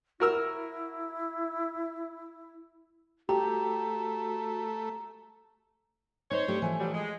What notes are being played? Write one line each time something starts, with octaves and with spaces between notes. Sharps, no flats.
E4 F#4 A#4 E6
A3 F#4 G4 A#5
D#4 C5 C#5
A3 D4 G4
E3 F3 A3
B2 F#3 G3
G#3